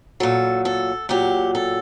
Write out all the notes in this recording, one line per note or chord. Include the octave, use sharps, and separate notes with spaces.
A#2 F#3 A4
A4
A#2 F#3 G4
A4